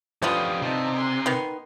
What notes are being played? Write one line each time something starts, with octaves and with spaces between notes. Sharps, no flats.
D3 F3 B3 C#4 F4 G4 D#6
C3 D#4 A5
G#5 C6
D#3 B3